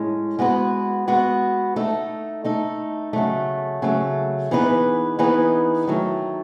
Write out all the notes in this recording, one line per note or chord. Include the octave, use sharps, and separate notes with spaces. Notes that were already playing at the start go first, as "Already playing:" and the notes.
Already playing: A2 G#3 C#4
G#3 B3 F#4 B4
G#3 B3 F#4 B4
A3 D#4 A4
A3 D#4 A4
C#3 F#3 A3
C#3 F#3 A3
E3 B3 D#4 G#4 B4
E3 B3 D#4 G#4 B4
D#3 F#3 A3